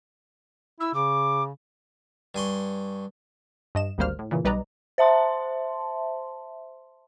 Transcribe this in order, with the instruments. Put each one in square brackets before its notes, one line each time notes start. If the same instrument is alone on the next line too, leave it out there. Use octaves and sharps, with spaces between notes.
[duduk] E4 [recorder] E6
[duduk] C#3 [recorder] D6
[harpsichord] G2 G#5 C6 C#6
[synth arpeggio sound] G2 D#5 E7
G#1 D2 G3 A#3 C5 F6
A2
A#2 C#3 E3
B1 G3 B4 D5 D#5 A#5
[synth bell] C5 E5 A5 C6